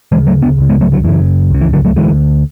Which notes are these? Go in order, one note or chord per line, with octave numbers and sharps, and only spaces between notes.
D2 C#3 E3 G#3
F#3 A3
B3 D4
C#2 C#3
G#3 B3
F#3 A3
D3 F#3
F#2 C#3 E3
C#2 C#3
E3
D3 F#3
F#3 A3
D2 D3 E3 G#3